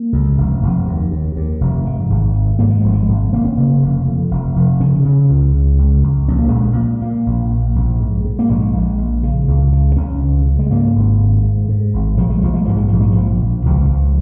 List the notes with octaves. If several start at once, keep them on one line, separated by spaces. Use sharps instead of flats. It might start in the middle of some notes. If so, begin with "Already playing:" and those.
Already playing: A#3
C#2
F1
F1
D#2
D#2
D#2
F1
G#2
G#1
G#2
G#2 A#3
G#3
G#1 F3
G#3
G#1
F1 A#3
C#4
C#3 A#3
F1
F2
F1
F1
C#3 C#4
C#3
C#2
C#3
C#2
C#2
A#1 C#4
A#3
A#2 G#3
A#3
A#2
A#2 A#3
A#1
A#1
A#1
G#2
G#2
A#3
A#1 G#3
A#1
A#1
C#3
C#2
C#3
C#2 C#4
C#3
C#3
G#3
G#2 A#3
G#1
G#2
G#2
G#2
G#1
A#1 F3
G#3
A#1 F3
G#3
G#2 F3
G#3
A#1 F3
G#3
A#1 F3
A#1
C#2 F3
C#2